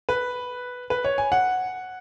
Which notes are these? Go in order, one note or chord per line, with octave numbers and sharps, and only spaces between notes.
B4
B4
C#5
G#5
F#5